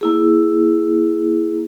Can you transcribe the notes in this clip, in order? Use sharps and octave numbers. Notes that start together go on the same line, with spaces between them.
A#3 E4 G#4